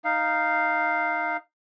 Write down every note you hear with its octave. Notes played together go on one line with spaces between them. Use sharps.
D#4 F5